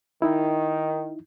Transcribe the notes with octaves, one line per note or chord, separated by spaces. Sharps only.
D#3 D#4 E4